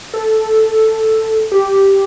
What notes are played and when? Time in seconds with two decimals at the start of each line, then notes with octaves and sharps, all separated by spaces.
0.14 A4
1.52 G4